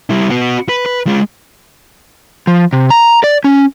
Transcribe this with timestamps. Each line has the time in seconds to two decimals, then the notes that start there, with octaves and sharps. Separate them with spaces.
0.10 G3 E4
0.30 B3 F#4
0.69 B4
0.86 B4
1.07 G#3 F4
2.47 F3
2.73 C3
2.90 A#5
3.24 D5
3.44 C#4